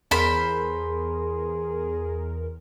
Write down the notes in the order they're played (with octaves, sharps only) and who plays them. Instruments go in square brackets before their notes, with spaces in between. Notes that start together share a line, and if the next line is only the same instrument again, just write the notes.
[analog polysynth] E2 A#4 [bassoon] G#4 [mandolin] C5 B5